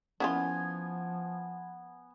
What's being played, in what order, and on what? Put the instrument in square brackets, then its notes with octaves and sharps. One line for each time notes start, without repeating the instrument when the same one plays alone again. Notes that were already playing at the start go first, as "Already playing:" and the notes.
[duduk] F3 [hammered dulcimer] B3 G#5 [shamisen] C#4 E4 F4